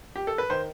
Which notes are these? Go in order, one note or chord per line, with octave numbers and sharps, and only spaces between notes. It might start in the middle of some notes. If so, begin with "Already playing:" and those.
G4
A4
B4
D#3 C5